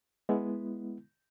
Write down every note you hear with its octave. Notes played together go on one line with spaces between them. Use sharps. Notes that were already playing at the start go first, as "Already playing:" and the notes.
G#3 B3 E4